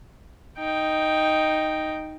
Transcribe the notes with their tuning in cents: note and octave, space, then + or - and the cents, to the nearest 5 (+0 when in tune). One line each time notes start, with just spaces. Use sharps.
D#4 +0 G5 +0